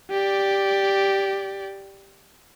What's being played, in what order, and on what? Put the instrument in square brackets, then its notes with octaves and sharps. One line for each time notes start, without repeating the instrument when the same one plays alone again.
[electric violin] G4 D5